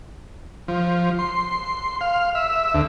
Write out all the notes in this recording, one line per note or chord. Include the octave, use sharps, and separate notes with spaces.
F3
C6
F5
E5
D2